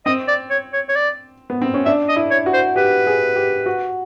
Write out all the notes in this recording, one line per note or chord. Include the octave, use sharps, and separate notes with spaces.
C4 D#5
D5
C#5
C#5
C#5
D5
B3
C4
C#4
D4 E5
D#5
E4
C#5
F#4
C5
G4 B4
G#4
G4
F#4